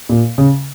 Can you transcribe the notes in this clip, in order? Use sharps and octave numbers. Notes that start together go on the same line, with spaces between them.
A#2
C#3